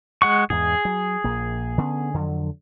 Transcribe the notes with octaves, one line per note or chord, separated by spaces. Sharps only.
G#3 F#5 C#6
E2 G#2 G#4
F#3
A#1 A#3
D3 B3 C#4
F2 D3 F#3